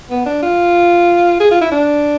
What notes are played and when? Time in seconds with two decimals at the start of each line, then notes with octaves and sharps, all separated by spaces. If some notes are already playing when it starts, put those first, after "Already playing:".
0.11 B3
0.26 D4
0.43 F4
1.40 G#4
1.51 F4
1.61 E4
1.72 D4